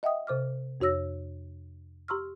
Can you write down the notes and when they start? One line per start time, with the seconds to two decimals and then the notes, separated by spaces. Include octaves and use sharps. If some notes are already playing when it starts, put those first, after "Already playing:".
0.03 D#5 E5 F#5 G5 D#6
0.27 C3 C5 D6 F6
0.80 F2 F#4 C#5 E6 A#6
2.08 G4 A#5 C6 C#6 E6 F6